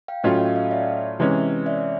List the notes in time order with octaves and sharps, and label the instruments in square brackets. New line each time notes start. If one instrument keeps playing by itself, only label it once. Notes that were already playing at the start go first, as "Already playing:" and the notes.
[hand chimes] F5 G5
[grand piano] A2 F#3 A3 C#4 F4 [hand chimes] D#5 F5
[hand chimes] D#5 F5
D#5 F5
D5 E5
[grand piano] C3 E3 G#3 C#4
[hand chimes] D5 E5